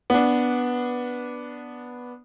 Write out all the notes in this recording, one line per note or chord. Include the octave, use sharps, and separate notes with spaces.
B3 D4